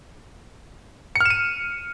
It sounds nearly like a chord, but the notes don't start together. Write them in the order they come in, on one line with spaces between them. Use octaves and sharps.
C#7 F6 E7 D#7